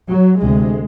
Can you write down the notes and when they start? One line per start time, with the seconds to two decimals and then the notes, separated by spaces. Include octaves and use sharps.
0.09 F#3
0.40 D2 C3 G#3